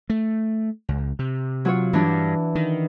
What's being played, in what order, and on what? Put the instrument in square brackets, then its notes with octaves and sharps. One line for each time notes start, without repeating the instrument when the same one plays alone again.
[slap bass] A3
C#2
C3
[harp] F#3 F4 C#5
[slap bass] G2 [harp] E3 D4
[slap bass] D#3